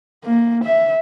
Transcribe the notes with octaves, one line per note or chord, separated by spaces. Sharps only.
A#3
E5